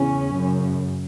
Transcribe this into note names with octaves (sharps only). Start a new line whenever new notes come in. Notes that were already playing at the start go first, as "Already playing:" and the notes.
Already playing: E2 C#3 C#4
F#2 C#3